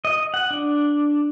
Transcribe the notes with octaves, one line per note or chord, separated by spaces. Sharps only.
D#5
F#5
D4